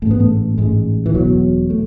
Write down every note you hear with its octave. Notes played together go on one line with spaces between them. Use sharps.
A1 G#2 A3 B3
A3
A1 G#2 G#3
E3
E1 E2 B2 F#3
A3